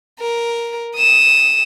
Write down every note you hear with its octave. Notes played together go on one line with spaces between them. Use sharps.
A#4
D#6 E7